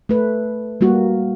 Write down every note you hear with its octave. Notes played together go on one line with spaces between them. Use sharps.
A3 B4
G3 A#3 F#4